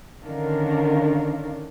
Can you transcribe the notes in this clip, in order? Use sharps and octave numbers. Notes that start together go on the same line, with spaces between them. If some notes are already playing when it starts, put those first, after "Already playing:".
D3 D#3 C#4 D4 A#4 F5